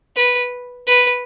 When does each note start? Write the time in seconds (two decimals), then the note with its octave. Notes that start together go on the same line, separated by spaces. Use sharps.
0.16 B4
0.87 B4